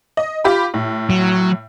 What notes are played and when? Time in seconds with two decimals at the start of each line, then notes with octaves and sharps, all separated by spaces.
0.17 D#5
0.44 F4 G4 B5
0.74 A2
1.10 F#3